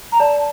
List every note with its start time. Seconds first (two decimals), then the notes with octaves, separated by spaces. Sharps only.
0.12 A#5
0.20 D5 A5